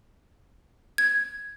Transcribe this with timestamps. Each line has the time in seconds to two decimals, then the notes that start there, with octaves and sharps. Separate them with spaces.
0.98 G#6